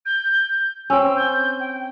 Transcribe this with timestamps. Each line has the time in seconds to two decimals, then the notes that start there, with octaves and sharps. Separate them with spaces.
0.05 G6
0.90 C4 C#4 E6
1.16 G6
1.59 G5